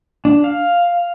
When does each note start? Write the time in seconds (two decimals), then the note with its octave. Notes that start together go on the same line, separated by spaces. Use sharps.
0.25 D4
0.44 F5